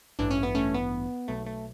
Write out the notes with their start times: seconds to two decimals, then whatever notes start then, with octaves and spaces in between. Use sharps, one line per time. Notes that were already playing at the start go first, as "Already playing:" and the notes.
0.19 A1 G2 E3 D4
0.31 C#4
0.43 B3
0.55 A3 C#4
0.74 B3
1.28 B1 B2 F#3 A3
1.46 A3